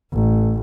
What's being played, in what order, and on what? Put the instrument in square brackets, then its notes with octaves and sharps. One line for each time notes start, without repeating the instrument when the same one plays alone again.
[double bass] A1